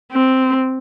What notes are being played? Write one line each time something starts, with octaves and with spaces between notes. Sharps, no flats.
C4